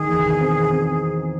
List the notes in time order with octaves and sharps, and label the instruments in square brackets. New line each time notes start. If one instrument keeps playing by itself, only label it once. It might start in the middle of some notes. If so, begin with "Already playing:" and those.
Already playing: [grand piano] D#3 [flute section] G#4
[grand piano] E2
B2
C4
C4
C4